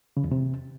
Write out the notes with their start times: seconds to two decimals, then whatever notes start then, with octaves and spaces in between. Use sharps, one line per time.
0.17 C#3
0.24 E2
0.32 C3